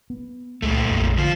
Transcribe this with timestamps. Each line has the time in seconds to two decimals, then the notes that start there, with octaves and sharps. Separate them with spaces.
0.10 B3
0.62 C#2 A#2 G#3 A3
0.91 A#1 F2
1.18 D3 F3 F4